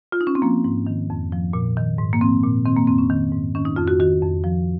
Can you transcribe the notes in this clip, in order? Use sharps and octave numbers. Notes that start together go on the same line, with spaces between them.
F4
D#4
C#4
C4
F3 A#3
G#2
D#3
F2
F3
A#2
D#3
G#2
A#3
F3 C4
A#2
D#3 C4
A#3
F2 C4
C#4
D#3
G#2
D#3 C#4
D#4
F2 F4
F#4
D#3 F#4
F2
F3